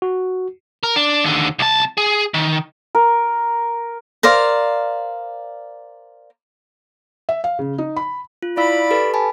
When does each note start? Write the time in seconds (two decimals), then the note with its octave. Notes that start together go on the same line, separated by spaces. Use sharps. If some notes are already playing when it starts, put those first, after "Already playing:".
0.02 F#4
0.83 A#4
0.96 D4
1.24 D#2 D3
1.59 C2 A5
1.97 G#4
2.34 D#3
2.95 A#4
4.23 A#4 C5 D5 F5
7.29 E5
7.44 F5
7.59 C#3
7.78 D#4
7.96 B5
8.42 F4
8.57 E4 D5 F5 B5 E6
8.91 G4 A4 B4
9.14 G#5 A5 B5